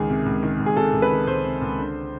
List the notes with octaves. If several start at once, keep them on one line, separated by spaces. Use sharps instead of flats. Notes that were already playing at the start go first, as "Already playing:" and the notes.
Already playing: C#2 D#3 G#4
C3
C#2
D#3
C#2
G#4
C3 A4
C#2
B4
D#3
C#2 C5
C3
C#2
D3